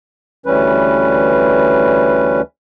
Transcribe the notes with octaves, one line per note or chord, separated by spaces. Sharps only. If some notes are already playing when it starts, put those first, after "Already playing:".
D2 E3 G3 C#4 B4